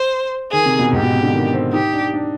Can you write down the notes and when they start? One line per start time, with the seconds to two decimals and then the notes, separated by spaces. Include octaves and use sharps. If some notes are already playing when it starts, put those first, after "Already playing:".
Already playing: C5
0.52 D#3 G#4
0.65 C3
0.79 B2
0.93 G#2 G4
1.03 B2
1.12 C3
1.22 D3
1.33 D#3
1.53 C4
1.73 D#4 G4
1.93 D4
2.14 D4